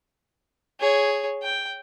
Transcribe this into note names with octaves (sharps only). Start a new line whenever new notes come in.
G#4 C#5
G5